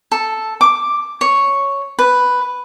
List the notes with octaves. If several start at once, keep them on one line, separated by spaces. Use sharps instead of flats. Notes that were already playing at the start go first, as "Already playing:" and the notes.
A4
D6
C#5
B4